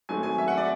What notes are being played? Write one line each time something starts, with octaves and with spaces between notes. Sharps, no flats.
G#1 G#2 F#3 A3 G#5
G#5
E5
F#5
D5